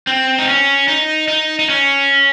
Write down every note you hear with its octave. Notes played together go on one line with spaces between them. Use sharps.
C4
D#4
C#4
D#4
D#4
D#4
C#4